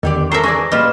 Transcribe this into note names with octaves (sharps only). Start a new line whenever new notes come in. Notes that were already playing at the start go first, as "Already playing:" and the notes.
E2 D3 D#3 G4 D5
F#3 A4 A#4 C5 E5 A#6 C7
E3 G#3 G#4 D5 C#6 A#6
A#2 G3 F4 B4 D#5 B5 F6 E7